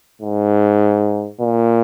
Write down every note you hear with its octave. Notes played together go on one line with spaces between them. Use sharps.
G#2
A#2